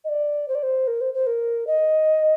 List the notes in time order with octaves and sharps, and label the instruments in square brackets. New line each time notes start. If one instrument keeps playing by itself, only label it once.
[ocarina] D#5
D5
C5
D5
C5
A#4
C5
C5
A#4
D#5